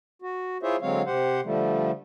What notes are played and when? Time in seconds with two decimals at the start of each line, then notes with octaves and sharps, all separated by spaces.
0.22 F#4
0.63 E4 F4 G#4 C5 C#5 E5
0.82 D3 F#3 G#3 C4 C#5 F5
1.06 C3 G4 C5 F#5
1.44 D3 F3 G3 A3